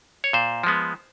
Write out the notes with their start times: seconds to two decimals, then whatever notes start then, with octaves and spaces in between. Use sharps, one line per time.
0.24 C#5
0.33 A#2 C5
0.63 F3 G#3 B3